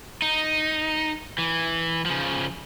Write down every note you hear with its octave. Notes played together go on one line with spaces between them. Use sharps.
D#4
E3
C#3 F3